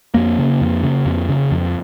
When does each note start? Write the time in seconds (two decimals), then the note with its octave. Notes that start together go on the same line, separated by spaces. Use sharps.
0.14 F2 A#3
0.38 C#3
0.61 F2
0.83 C#3
1.06 F2
1.29 C#3
1.52 F2